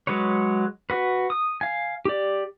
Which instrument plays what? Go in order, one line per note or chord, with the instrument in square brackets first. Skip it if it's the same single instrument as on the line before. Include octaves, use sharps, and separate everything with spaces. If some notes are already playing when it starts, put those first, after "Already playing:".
[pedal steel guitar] F#3 G#3 B4 C#5
F#4 B4
D#6
F5 G#5
G4 D5